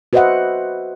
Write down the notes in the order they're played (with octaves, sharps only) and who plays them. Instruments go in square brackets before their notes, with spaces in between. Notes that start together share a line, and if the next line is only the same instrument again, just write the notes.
[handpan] F#4 B4 C5 D#5 E5 F#5